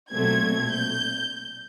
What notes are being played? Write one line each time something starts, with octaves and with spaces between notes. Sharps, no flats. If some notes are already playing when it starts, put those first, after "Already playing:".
B1 A#2 F#3 A3 C4 G#6
G6